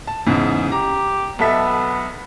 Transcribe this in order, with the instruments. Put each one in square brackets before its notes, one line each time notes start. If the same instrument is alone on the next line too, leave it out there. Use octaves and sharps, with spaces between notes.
[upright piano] A5
E2 G#2 C#3
[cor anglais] G4 [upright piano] A#5
[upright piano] B1 A4 E5 [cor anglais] B3